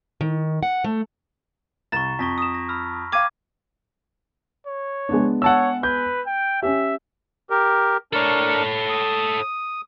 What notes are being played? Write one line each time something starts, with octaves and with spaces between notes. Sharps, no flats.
D#3
F#5
A3
C2 A#5 C#6 A6 E7
F2 C#6 A#6 B6
D#6 E7
A#6
B5 E6 F6
F5 G5 D6 G#6 D#7
C#5
G#3 B3 D4
C#5 F#5 A5 E6
B4 G6
G5
C#4 G4 E5
G4 A#4
D4 A4 A#4 C#5
D#6